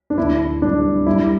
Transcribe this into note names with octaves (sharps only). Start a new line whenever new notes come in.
D4
D2 E4
G3 D4
G3 E4